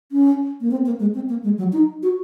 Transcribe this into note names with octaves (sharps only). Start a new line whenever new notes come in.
C#4
A#3
C4
A#3
G#3
C4
A#3
G#3
F#3
D#4
F#4